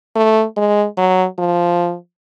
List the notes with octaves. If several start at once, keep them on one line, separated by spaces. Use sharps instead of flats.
A3
G#3
F#3
F3